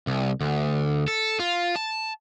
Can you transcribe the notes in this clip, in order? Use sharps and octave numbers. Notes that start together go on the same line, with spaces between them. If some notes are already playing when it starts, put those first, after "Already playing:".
C2
D2
A4
F4
A5